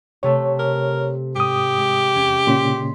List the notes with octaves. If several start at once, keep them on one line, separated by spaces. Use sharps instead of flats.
C3 A3 A4 C#5
A#4
G#2 G4 D#6
G#3
E2 C#4
A#2 C#3 C#4 C6 B6